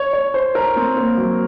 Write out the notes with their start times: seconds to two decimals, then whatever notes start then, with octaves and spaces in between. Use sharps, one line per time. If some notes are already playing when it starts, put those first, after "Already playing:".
Already playing: C#5
0.13 C#5
0.34 C5
0.55 A#4
0.76 C4
0.97 A#3
1.17 F#3